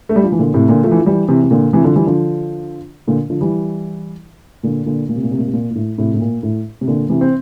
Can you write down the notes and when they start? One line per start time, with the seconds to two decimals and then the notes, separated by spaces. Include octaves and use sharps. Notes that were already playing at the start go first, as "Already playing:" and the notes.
0.09 A3
0.16 G3
0.24 F3
0.32 E3
0.39 A#2 D3
0.54 A2 C3
0.68 A#2 D3
0.83 F3 A3
0.91 E3
0.98 F3
1.06 E3 G3
1.28 C3 E3
1.43 C3
1.51 A#2 D3
1.73 C3 E3
1.84 D3 F3
1.96 E3 G3
2.06 D3 F3
3.07 A#2 D3
3.30 D3 F3
3.41 E3 G3
4.63 A#2 D3
4.86 A#2 D3
5.09 A#2
5.16 C3
5.23 A#2
5.31 C3
5.38 A#2
5.46 C3
5.53 A#2
5.71 A#2
5.75 A2
5.98 A2 C3
6.14 A2
6.20 A#2
6.43 A2
6.81 C3
6.87 A#2 D3
7.09 C3 E3
7.21 C4